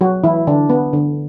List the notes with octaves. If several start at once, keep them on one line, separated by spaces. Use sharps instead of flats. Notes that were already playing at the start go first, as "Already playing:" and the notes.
F#3 F#4
E3 E4
D3 D4
B3
D3